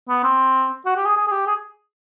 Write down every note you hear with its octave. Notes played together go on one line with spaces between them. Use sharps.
B3
C4
F#4
G4
G#4
G#4
G#4
G4
G#4